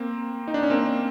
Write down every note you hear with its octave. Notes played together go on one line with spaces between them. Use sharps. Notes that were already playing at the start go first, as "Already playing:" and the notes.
Already playing: A#3 C4
D#4
D4
C#4
A#3 C4